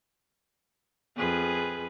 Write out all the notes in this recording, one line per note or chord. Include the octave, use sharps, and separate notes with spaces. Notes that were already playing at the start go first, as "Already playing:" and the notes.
F2 G#4 B4